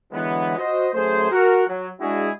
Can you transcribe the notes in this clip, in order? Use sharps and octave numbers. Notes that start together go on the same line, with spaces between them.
D3 E3 F#3 G#3 B3
F#4 C5 D#5
F#2 A3 G#4 C5
F#4 A#4 F#5
F#3
G#3 D4 E4 F#4 G#4